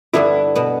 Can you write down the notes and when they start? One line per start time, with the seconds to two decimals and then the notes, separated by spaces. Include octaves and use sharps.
0.13 G2 D3 G3 B3 E4
0.55 B2 B3